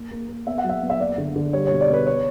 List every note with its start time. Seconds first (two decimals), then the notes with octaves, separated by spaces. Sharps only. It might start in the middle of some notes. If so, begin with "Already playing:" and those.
Already playing: A#3
0.11 A#3
0.29 A#3
0.46 B3 E5
0.58 F#5
0.64 F#3
0.69 E5
0.83 B3
0.90 E5
1.00 A#3 D5
1.18 D3
1.36 D3
1.53 G3 C#5
1.67 B2 C#5
1.81 D5
1.89 B3 B4
2.07 C#5